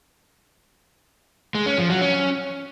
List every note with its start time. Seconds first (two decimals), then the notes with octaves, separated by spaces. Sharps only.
1.55 G#3
1.66 C#4
1.78 F3
1.90 F#3
2.01 C#4